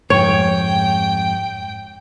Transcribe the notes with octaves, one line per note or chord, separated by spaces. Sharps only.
F2 G#2 C#5 G5